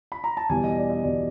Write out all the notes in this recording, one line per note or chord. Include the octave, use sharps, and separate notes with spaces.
B5
A#5
A5
E2 B2 G3 G#5
D#5
D5
D#5
E2 B2 G3 D5